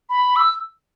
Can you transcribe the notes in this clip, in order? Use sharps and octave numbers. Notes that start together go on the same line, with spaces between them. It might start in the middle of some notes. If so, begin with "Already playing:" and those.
B5
E6